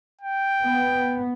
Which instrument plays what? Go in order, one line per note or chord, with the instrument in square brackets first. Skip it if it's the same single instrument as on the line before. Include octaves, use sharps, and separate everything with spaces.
[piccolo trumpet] G5
[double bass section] B3